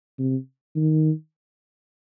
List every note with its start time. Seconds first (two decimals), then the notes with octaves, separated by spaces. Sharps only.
0.19 C3
0.76 D#3